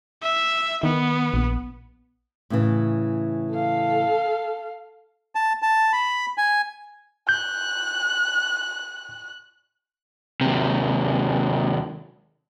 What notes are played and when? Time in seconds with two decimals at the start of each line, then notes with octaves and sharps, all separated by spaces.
0.23 E5
0.83 D#3 B3
1.34 A#1
2.50 A2 C#3 E3
3.51 A4 F5
5.35 A5
5.62 A5
5.93 B5
6.37 G#5
7.29 F#6 G6
10.41 D#2 C3